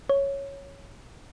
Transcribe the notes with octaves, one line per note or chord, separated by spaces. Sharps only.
C#5